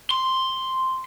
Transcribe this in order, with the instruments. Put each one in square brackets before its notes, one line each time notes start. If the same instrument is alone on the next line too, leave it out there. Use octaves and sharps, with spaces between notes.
[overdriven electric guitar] C6